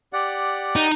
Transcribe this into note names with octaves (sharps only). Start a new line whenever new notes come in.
G4 D5 F#5
D#4